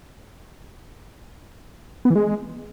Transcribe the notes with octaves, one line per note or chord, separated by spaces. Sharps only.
B3
E3
G#3